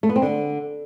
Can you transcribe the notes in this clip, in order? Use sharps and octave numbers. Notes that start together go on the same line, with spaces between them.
A3
B3
C4
D3